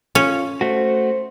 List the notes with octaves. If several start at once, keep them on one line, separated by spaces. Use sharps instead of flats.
C#4 F4
A3 F#4 C5